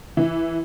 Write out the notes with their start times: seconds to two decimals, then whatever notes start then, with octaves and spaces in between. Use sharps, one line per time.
0.17 E3